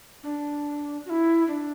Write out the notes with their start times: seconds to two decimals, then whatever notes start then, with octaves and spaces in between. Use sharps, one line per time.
0.23 D4
1.06 F#4
1.10 E4
1.48 D4